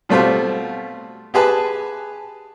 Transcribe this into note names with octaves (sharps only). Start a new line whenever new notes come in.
B2 G3 A3 C4 F4
G4 G#4 B4 A5